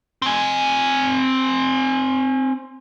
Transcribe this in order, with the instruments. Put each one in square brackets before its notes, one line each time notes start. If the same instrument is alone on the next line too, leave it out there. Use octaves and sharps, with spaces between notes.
[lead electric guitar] C4 G#5